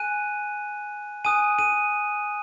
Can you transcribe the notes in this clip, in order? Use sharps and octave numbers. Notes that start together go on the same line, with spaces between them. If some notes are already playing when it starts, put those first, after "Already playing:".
Already playing: G#5 F#6 D#7
G#5 D#6 F#6 D#7
D#7